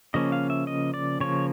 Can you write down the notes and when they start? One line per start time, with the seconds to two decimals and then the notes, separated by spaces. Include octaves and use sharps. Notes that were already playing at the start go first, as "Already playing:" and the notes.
0.14 C#3 F3 A#3 C#4 D#5
0.32 F5
0.50 E5
0.67 D#5
0.94 D5
1.20 C#3 F3 A#3 C#5